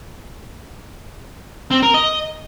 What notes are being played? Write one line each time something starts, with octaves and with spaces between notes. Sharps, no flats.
C4
A#4
D#5